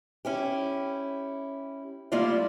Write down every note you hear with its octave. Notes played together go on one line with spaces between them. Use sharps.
C#4 E4 G4
G3 A3 A#3 E4 F4 D5